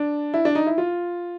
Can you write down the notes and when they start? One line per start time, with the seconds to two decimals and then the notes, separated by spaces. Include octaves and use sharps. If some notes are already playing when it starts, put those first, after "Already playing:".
Already playing: D4
0.34 E4
0.45 D4
0.55 D#4
0.67 E4
0.78 F4